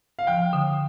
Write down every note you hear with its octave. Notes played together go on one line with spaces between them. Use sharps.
F5
F3 G5
D3